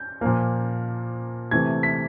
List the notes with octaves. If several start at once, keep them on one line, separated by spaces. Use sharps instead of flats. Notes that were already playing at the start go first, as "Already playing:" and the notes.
Already playing: G6
A#2 F3 A#3
C3 E3 A3 G#6
B6